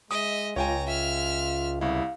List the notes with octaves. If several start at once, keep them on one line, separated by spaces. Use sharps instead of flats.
G#3 D#5 E5 D#6
C#2 F4 C#5 G5 G#5 A#5
F4 E5 F6
C2 E4 F5